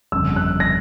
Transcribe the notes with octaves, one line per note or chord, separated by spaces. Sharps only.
G1 F2 C#3 E6
F#6
A#6